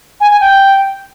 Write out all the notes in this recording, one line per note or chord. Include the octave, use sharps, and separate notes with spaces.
G#5
G#5
G5